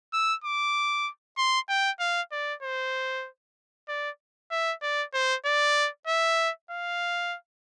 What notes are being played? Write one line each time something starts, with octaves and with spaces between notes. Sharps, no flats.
E6
D6
C6
G5
F5
D5
C5
D5
E5
D5
C5
D5
E5
F5